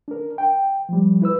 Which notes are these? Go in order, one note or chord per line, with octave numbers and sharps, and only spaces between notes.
D4 A#4
G5
F3 G3
E4 B4 E6